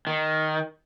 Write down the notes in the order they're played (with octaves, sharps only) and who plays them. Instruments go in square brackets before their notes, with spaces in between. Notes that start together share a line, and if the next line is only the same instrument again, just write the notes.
[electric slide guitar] D#3